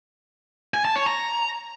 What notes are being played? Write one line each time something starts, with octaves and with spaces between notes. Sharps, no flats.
G#5
A5
C#5
A#5